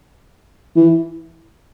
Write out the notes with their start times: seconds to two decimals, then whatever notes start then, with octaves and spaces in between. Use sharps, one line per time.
0.76 E3